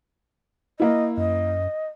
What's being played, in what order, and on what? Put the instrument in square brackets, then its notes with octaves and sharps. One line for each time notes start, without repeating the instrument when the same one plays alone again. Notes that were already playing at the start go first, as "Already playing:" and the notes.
[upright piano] A#3 E4 [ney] D#5
[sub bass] F#2 [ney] D#5